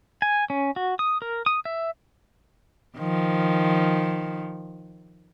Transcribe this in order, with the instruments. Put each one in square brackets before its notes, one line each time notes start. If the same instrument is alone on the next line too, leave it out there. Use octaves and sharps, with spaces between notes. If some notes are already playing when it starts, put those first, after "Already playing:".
[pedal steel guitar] G#5
C#4
F#4
D#6
A#4
D#6
E5
[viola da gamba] D#3 F3